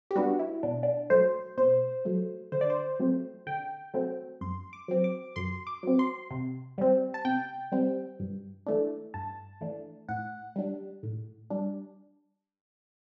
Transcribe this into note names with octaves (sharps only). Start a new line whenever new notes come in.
G4
G3 B3 D4 F#4
E4
B2 D4
D4
F#3 A3 C5
B2 C5
F#3 A3
D3 C5
D5
C5
F#3 A3 C4
D3 G5
F#3 A3 C4
F#2 C6
D6
F#3 C4
D6
F#2 C6
D6
F#3 C4
C6
C3
G3 C4
A5
C3 G5
G3 C4
G2
E3 A3 D4
G2 A5
E3 A3 D4
A2 F#5
G3 D4
A2
G3 D4